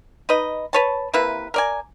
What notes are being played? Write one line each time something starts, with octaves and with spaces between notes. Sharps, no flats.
D#4 B4 D#5
B4 C#5 A5
C3 A#3 E4 B4
A#4 D5 G#5